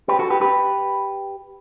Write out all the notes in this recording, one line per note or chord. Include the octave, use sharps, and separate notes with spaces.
G4 B4
F#4 A4
G4 B4
G4 B4